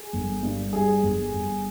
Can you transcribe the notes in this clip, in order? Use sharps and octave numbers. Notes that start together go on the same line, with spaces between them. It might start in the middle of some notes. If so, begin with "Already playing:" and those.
Already playing: G#4
G1
G2
G3 G#4
G1
G1